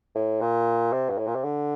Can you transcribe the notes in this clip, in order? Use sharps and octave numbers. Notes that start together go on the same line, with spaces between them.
A2
A#2
C3
G2
A2
A#2
C3
D3